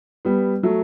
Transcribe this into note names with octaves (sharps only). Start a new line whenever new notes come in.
G3 B3
F#3 A3